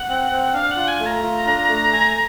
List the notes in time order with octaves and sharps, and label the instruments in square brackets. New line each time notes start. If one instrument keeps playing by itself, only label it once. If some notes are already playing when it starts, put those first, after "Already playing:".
Already playing: [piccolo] F#5
[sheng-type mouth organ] C4
C4
[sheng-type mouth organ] D4 [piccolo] F5
[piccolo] F#5
[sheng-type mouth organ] F4
[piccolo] G#5
[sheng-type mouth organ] A3
[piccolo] A#5
[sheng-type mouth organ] F4
D4
A3
G#5